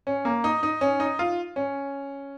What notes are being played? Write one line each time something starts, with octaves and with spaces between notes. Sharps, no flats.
C#4
A#3
D#4
D#4
C#4
D#4
F4
C#4